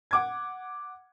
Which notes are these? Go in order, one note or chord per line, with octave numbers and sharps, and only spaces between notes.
F#5 D6 G#6